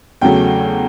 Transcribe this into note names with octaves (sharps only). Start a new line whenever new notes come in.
E2 C#3 F#3 A3 G5